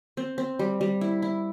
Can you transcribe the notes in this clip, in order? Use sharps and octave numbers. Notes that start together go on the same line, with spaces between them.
C4
C4
G3
G3
E4
E4